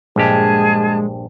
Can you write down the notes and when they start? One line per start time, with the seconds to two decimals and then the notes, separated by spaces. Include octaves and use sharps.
0.16 A#1 G2 G#3 G4 G#4 A5